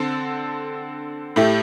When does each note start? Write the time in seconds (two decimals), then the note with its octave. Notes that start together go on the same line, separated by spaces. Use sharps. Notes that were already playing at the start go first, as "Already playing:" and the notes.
Already playing: D3 C4 A4
1.36 A2 A3 E4 G4